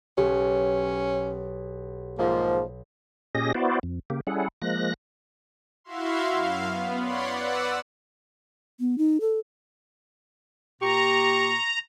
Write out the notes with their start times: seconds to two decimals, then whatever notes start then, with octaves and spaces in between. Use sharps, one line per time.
0.18 B1 C#4 G4
2.18 G#2 F3 A#3
3.35 A#2 C#4 G4 G#4 D#5 A#6
3.55 B3 E4 F#4 C5 D5
3.83 F2
4.10 C#3 A#3 G4
4.27 G3 C#4 E4 G#4 A4 F#5
4.62 F3 G#3 A#3 F#6 A#6
5.84 E4 F#4 E5 F5 C6
6.30 F#2 F5
6.66 B3
7.00 C#5 D5 F#5 B5 C6
7.33 B4 D5 F#5 E6
8.80 B3
8.98 D#4
9.21 A4
10.82 A#2 G4 A#5 C#6